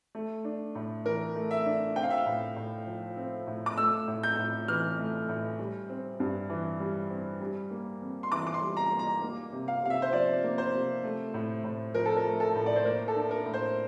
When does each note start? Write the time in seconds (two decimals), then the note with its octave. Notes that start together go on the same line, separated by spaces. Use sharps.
0.15 A3
0.44 D4
0.75 A2
1.05 E3 A#4
1.35 A3
1.51 E5
1.66 D4
1.96 C4 G5
2.03 F5
2.10 E5
2.18 F5
2.26 A2
2.56 A2
2.87 F3
3.17 C4
3.47 A2
3.66 D6
3.77 A3 E6
4.08 A2
4.23 G6
4.39 A2
4.68 E3 F6
4.99 A3
5.29 A2
5.59 G3
5.90 C4
6.20 G2
6.50 E3
6.80 G3
7.10 C4
7.41 G3
7.71 A#3
8.01 F2
8.23 C6
8.32 E3 D6
8.47 D6
8.54 C6
8.62 G3
8.77 A#5
8.92 A#3
8.99 A#5
9.22 A#3
9.52 C3
9.68 F5
9.83 C3 F5
9.90 E5
10.02 C5
10.13 F3 D5
10.43 A#3
10.58 C5
10.74 C3
11.03 A3
11.34 A2
11.64 A2
11.95 F3 A#4
12.06 A4
12.16 A#4
12.25 A3
12.40 A4
12.55 A2
12.66 D5
12.76 C5
12.85 A#3 A#4
13.08 A4
13.16 D4
13.31 A#4
13.46 A2
13.54 C5